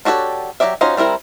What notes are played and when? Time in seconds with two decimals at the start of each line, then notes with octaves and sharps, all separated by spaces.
0.05 D4 F#4 G4 A4 C#5
0.60 F#3 C4 G4 D5 E5
0.81 C#4 D#4 F4 F#4 C5
0.97 G3 C4 E4 A#4